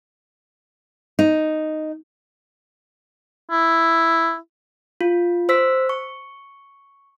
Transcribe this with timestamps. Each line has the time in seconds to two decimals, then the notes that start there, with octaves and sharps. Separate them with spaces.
1.19 D#4
3.51 E4
5.01 F4
5.49 C5 E6 B6
5.89 C#6